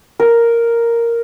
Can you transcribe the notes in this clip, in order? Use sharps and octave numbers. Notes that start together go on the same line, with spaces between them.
A#4